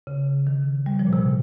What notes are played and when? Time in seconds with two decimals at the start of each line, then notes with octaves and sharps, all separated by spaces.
0.07 C#3
0.47 D#3
0.86 G3
0.99 F3
1.07 A#2
1.13 C3